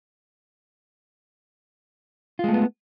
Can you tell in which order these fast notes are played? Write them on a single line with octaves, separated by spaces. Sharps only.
F4 G#3 A3 B3